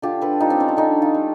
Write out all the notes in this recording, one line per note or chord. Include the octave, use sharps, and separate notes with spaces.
D3 F4 G4
A4 B4
G3 D#4 F4
C4
C#4
D4
D3 C#4 D#4
D#4 F4
G3